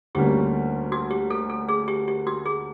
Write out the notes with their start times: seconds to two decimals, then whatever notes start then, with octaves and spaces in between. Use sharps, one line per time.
0.15 D2 D3 G3 A#3 C#4 G4
0.92 F#4
1.11 G4
1.30 A4
1.50 A4
1.69 G#4
1.88 G4
2.08 G4
2.27 F#4
2.46 G#4